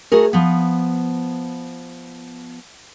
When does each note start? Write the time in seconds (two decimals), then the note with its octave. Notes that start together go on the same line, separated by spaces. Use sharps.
0.12 A3 F#4 G#4 A#4
0.33 F3 B3